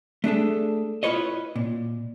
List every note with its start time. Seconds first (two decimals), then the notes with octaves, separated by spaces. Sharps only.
0.24 A3 D4 G#4 A4
1.03 E4 F4 A4 B4 C#5 D#5
1.56 A#2